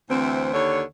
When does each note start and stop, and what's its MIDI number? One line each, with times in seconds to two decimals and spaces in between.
0.10 0.51 38
0.10 0.51 52
0.10 0.51 60
0.54 0.82 39
0.54 0.82 50
0.54 0.82 73